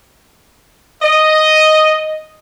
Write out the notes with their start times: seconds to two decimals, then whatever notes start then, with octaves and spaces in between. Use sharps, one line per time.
1.02 D#5